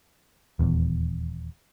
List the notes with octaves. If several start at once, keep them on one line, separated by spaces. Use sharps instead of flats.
D#1 E2